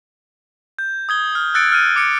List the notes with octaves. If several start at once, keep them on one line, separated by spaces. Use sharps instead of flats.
G6
D#6 G#6 G7
F6
E6 F#6 A6 C#7 D7
F6 D#7
D6 C#7 D7